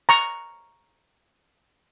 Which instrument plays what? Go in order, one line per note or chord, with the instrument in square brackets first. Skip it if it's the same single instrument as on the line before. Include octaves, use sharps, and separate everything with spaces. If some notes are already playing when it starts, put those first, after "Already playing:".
[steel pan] A#5 C#6